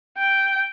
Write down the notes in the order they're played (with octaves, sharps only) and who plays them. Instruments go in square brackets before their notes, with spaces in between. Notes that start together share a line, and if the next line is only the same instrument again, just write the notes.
[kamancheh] G5